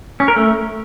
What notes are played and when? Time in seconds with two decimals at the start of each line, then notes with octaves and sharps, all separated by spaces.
0.20 C#4
0.28 A#4
0.36 A3